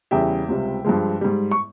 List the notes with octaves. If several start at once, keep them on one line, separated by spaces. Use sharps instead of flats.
E2 C#3 G3 E5 G5
C#2 C3 G3
G2 F3 G#3
G#2 G3
C#6